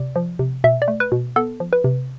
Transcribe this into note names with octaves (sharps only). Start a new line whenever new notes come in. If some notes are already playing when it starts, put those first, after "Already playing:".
Already playing: C3 D5
F3
C3
B2 E5
D5
A3
B4
B2
B3 A4
F3
B4
C3